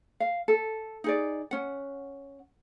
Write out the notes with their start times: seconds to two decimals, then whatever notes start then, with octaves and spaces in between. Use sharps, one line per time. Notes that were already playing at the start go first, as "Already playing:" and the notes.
0.20 F5
0.48 A4
1.04 D#4 G#4 D5
1.51 C#4 F#5